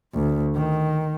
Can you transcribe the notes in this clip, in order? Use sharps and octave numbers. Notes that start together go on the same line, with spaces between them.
D2
D#3